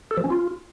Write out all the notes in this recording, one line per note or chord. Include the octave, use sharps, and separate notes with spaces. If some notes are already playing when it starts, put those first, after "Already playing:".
A4
F3
C#4
F4